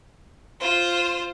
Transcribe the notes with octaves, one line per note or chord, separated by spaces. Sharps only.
F4 C5